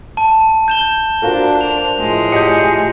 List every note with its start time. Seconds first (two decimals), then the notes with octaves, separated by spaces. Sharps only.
0.17 A5
0.68 G6 E7 G7
1.22 D4 F4 F#4 A#4 C5
1.61 F7
2.00 A2 F3 G#3
2.32 G4 D#5 G5 G6 C#7